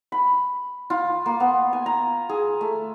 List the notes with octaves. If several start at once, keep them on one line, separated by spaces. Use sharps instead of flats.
B5
F4
A#3
B3
G#5
A#5
G#4
A3